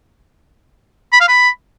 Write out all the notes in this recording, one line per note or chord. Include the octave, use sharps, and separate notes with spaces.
B5
F5
B5